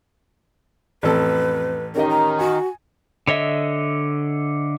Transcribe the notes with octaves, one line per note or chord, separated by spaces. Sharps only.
A1 F2 A4 B4
D#3 C#4 G4 A#4 D#5
A#5
F#4 G#5
D3 C#5 D#5 E5